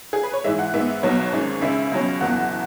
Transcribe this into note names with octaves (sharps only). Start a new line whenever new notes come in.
G#4
B4
C#5
G#2 E3 G#3 E5
F#5
G#2 G#3 B3 E5
B1 B2 F#3 B3 C#5
G#1 G#2 G#3 C#4
C#2 C#3 G#3 E5
C#2 B2 F#3 C#4
F#1 E2 B2 F#3 F#5